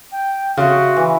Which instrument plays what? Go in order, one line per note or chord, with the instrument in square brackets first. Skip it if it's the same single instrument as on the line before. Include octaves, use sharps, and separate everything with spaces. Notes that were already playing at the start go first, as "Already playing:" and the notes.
[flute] G5
[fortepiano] C#3 [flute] F#4 [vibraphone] E5 C6 C#6
[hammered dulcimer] E3